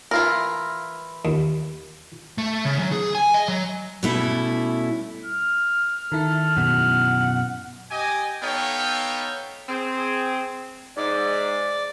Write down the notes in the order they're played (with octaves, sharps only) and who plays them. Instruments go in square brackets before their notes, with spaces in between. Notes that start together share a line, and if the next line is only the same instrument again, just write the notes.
[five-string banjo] E3 F4 A#4
[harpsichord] D#2
[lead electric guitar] A3
C#3
F#3
G#4
G#5
D#5
F#3
[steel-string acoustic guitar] B2 G3 A3 C#4 E4
[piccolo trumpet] F6
[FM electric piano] D#3 E4 [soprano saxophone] A4
[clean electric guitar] F#2 B2 [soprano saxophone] F#5
[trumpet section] G4 D#5 G#5
B3 D#4 A4 C#5 F5 G5
[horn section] C4 G#4
[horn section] G#2 [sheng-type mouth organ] D5